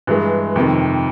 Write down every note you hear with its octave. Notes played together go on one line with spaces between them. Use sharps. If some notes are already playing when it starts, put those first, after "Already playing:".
G2 E3 G#3
F2 C3 D#3